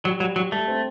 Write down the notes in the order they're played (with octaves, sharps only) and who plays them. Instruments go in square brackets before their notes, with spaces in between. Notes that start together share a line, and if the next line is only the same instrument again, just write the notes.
[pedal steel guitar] F#3 [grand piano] G3
[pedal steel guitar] F#3 [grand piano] G3
[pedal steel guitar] F#3 [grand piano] G3
[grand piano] G3 [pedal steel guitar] A3
[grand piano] C4